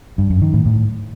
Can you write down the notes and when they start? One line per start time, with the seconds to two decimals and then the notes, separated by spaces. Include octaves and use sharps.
0.18 G2
0.30 F#2
0.42 D#3
0.54 A2
0.65 A2